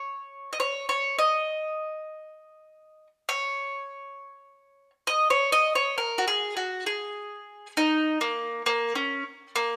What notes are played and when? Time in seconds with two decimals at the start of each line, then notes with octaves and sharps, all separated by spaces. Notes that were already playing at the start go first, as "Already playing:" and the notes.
Already playing: C#5
0.53 D#5
0.60 C#5
0.89 C#5
1.19 D#5
3.29 C#5
5.07 D#5
5.30 C#5
5.52 D#5
5.75 C#5
5.98 A#4
6.18 F#4
6.28 G#4
6.57 F#4
6.86 G#4
7.77 D#4
8.21 A#3
8.66 A#3
8.95 C#4
9.56 A#3